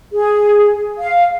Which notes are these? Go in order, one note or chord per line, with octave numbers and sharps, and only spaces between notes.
G#4
F5